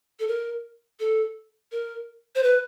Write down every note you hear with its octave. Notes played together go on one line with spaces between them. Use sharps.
A4
A#4
A4
A#4
C5
B4